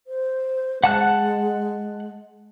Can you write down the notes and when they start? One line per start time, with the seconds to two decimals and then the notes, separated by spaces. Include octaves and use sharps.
0.07 C5
0.84 G#3 F#5 A5 F#6